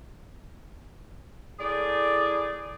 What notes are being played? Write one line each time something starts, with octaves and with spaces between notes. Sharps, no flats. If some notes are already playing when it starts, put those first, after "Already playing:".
A2 G#4 D5